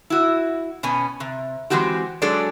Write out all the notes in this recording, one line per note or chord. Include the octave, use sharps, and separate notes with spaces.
E4 F#4
B2 B3 C#4 G#5
C3
E3 G#3 C4 F#4 G4
F#3 G#3 D4 G#4 A4 D5